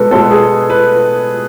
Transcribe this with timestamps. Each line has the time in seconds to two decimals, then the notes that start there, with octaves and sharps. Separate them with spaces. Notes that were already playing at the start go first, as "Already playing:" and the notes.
Already playing: B2 G#3 B3 A4 B4
0.11 B2 G#3 B3 A4
0.31 G#4
0.70 B4